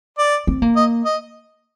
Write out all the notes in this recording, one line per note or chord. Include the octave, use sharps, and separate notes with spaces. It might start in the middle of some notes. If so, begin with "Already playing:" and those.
D5
C4
A#3
D#5
D#5